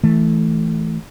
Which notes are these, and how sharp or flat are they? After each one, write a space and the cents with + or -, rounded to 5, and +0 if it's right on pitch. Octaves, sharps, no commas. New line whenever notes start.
E3 -10 A3 -10